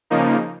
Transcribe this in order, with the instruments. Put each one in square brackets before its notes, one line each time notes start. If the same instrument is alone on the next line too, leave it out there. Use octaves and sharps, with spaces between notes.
[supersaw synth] C#3 F3 A#3 D#4